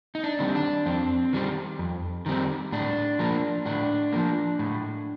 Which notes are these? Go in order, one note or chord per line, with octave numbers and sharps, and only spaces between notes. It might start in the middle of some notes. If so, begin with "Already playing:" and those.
D#4
D4
D#3 G3 C4
D4
F2 C4
D#3 G3 C4
F2
D#3 G3 C4
A2 D4
F3 A#3
A2 D4
F3 A#3
A2